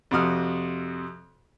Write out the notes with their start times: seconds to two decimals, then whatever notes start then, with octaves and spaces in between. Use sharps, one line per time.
0.11 F2 C3 F#4 D#6 F6